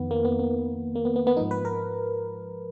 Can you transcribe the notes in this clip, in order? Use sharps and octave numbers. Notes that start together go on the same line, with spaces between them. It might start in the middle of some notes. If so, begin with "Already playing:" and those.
Already playing: F2 D#3 B3
A#3
B3
B3
A#3
B3
B3
B3
G#2 F3 D#4
B4
A#4